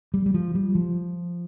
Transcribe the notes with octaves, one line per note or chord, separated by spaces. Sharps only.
G3
G3
F3
G3
F3